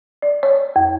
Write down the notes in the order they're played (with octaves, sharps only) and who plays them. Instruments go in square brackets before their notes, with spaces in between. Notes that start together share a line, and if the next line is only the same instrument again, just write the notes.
[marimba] D5
C#5
F2